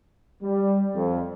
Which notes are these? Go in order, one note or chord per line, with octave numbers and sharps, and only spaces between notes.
G3
F2